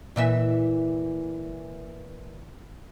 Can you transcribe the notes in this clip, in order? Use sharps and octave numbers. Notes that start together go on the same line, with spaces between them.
A#2 E3 E5